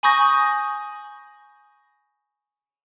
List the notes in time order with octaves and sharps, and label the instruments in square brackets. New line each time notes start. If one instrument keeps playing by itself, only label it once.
[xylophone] G#5 B5 C#6 D#6 G6 A#6